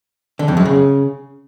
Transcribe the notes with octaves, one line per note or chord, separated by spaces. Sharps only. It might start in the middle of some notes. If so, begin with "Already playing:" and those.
D3
F2
F#2
C#3